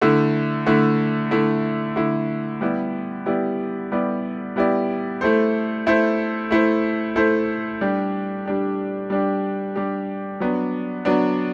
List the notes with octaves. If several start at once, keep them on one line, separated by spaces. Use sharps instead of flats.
D3 A3 E4
D3 A3 E4
D3 A3 E4
D3 A3 E4
G3 B3 E4 G4 D5
G3 B3 E4 G4 D5
G3 B3 E4 G4 D5
G3 B3 E4 G4 D5
A3 E4 A4 C5
A3 E4 A4 C5
A3 E4 A4 C5
A3 E4 A4 C5
G3 D4 G4
G3 D4 G4
G3 D4 G4
G3 D4 G4
F#3 B3 D4
F#3 B3 D4